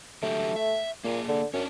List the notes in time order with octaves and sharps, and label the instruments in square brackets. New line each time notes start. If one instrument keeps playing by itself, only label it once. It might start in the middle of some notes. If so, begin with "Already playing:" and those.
[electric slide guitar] D3 F#3 G4 [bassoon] A3
[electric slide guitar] E5
[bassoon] A#2 [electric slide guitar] A#3 G#4
[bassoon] D3
[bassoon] F#2 [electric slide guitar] C#4 D4